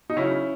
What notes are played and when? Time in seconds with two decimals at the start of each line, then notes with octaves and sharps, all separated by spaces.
0.10 D#4
0.17 C#3 F#3 C#4 E4